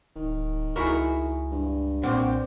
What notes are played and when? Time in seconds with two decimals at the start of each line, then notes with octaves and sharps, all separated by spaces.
0.16 D1 D#3
0.76 C#2 E4 F#4 G#4 A#4 C#6
1.51 G2
2.03 B1 A#2 C4 F#4 G4 C5